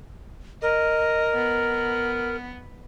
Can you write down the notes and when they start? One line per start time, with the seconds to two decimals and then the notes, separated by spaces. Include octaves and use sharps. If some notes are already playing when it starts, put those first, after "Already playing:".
0.62 A#4 D#5
1.35 B3